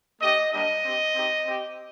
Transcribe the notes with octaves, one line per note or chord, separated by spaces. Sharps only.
A3 D4 G4 D#5
G3 A#3 D4 G4 D#5
C4 G4
C4 D#4 G4
C4 G4